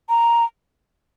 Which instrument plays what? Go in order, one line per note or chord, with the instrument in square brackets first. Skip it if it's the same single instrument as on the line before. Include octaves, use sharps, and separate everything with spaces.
[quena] A#5